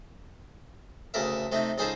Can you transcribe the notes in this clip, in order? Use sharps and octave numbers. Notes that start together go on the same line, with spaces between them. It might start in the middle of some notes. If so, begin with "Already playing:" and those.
D2 C#3 A4 A#4 E5
C3 A3 D#4
C#2 D#4 G#4 A4 C5 B5